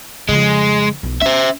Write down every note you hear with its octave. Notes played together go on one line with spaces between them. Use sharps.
F2 C#3 G#3
B1 F3
C#4 C5 E5